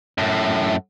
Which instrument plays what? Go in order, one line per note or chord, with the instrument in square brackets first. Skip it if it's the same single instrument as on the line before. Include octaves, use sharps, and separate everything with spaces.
[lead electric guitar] F#2 A2